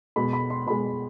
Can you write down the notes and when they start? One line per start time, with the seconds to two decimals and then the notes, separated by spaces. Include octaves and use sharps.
0.16 B2 G#3 B5
0.33 B5
0.50 C6
0.66 B2 G#3 B5